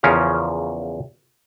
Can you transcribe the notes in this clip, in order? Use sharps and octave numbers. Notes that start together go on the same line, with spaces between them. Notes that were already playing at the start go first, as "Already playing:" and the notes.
E2 C#3 F3 C#4 A#4 F5